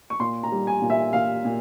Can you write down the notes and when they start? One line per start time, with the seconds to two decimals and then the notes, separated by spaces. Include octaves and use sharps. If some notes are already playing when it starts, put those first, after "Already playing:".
0.10 C#6
0.20 A#2 C6
0.43 A#5
0.52 G3
0.67 G#5
0.82 A#2
0.90 E5
1.13 A#2 F5
1.45 A#2